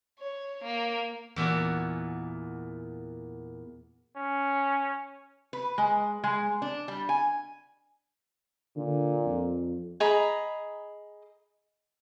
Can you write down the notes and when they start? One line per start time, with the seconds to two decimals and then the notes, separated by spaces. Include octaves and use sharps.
0.19 C#5
0.64 A#3
1.36 E2 A#2 F#4 G#5
4.16 C#4
5.53 B4
5.78 G#3
6.24 G#3
6.62 D4
6.88 G3
7.09 G#5
8.77 A#2 D3
9.25 F2
10.00 G#4 D#5 A#5 B5